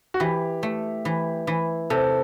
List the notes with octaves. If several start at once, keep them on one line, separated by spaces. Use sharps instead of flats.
F#4
E3 G4
A3
E3
E3
C3 A4